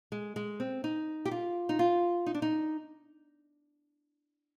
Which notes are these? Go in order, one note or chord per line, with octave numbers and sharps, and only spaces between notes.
G#3
G#3
C4
D#4
G4
F4
D#4
F4
D#4
D4
D#4